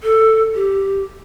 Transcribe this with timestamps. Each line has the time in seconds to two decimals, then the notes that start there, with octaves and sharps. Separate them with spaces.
0.03 A4
0.55 G4